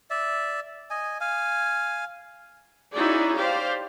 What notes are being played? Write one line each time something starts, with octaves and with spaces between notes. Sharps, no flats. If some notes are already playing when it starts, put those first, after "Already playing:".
D5 E5
D#5 G#5
F5 G#5
C#4 D#4 E4 F#4 G#4 D5
G4 C5 D5 F5